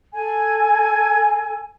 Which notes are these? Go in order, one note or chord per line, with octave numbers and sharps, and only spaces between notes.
A4 G#5